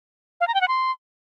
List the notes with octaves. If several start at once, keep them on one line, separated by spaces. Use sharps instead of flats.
F5
A#5
G5
F#5
C6